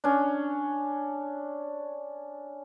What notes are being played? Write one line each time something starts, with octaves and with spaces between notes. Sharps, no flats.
C#4 D4